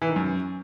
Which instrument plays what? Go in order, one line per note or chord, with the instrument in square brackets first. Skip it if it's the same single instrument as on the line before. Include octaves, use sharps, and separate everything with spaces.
[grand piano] E3
D#3
F#2